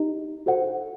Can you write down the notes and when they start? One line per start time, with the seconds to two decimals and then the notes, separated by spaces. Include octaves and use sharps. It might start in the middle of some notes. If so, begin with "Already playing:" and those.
Already playing: D#4 G4 D#5
0.46 F#4 A4 C5 F#5